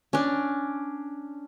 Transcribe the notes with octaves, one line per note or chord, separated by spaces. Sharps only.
C#4 D4